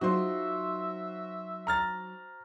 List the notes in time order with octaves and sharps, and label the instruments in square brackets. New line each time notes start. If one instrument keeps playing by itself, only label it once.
[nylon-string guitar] F#3 D#4 F4 [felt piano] F#4 C5 C6 [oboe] E5
[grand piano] A#5 F6 A6